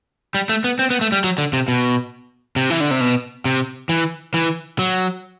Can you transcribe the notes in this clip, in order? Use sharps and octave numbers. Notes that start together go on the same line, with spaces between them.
G3
A3
B3
C4
B3
A3
G3
F#3
D3
C3
B2
C3
E3
D3
C3
B2
C3
E3
E3
F#3